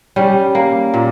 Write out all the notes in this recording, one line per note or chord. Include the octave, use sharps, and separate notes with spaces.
G3 C#4
A#3
A#2